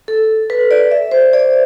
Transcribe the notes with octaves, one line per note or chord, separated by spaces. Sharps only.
A4
B4
D5
E5
C5
D5